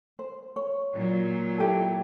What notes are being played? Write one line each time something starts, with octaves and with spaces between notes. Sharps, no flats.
C5
C#5
A#2 F#3
E4 G4 A4